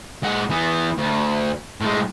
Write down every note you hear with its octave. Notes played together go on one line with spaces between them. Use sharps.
G#3 F#5
E3 B3
D2
A2 G#3